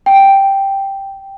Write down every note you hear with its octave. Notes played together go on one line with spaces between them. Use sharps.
G5